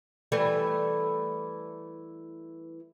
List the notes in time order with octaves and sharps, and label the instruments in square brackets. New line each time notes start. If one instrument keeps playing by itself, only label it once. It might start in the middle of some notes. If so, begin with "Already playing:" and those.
[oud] E3 G3 A3